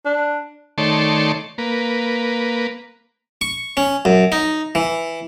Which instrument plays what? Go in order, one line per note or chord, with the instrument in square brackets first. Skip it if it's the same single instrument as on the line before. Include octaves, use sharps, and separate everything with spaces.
[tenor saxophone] D4
[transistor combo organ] D#3 A3 C#5 D5 A5 C6
A#3 B4
[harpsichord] C#6
C#4
F#2
D#4
E3